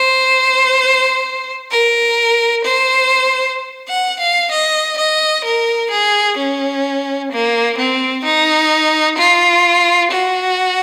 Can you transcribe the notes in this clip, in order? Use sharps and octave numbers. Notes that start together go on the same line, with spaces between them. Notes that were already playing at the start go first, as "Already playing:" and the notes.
Already playing: C5
A#4
C5
F#5
F5
D#5
D#5
A#4
G#4
C#4
A#3
C4
D#4
F4
F#4